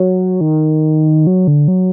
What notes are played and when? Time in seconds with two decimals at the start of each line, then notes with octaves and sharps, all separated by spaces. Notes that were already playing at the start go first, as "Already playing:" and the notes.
Already playing: F#3
0.41 D#3
1.27 F#3
1.47 D3
1.68 F#3